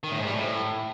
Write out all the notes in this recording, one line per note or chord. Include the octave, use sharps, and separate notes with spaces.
D#3
A2
G#2
G3
A2